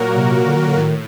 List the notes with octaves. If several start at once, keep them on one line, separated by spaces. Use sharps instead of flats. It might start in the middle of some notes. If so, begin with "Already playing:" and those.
Already playing: A#2 F#3 A#3 F#4 A#4
C3
D3
D#3
D3
A2 D#3